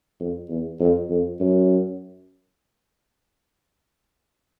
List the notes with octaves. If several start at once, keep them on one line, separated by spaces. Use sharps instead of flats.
F2
E2
F2
F2
F#2